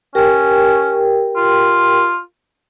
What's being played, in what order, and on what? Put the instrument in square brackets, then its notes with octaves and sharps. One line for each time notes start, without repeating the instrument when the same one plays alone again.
[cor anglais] C#4 [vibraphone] G4 A#4 G5
[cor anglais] F4